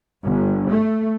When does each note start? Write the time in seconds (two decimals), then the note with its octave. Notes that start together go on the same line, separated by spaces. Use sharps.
0.22 G1
0.69 A3